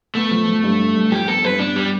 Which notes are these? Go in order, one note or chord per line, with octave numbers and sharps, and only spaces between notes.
A3 B3
F3
F3
G2
D3
G2
F3 G4
B3 A4
G2 B4
B3 D4
G3